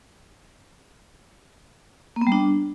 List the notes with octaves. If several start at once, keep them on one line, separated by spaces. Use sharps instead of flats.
A#3
B3
G3
D4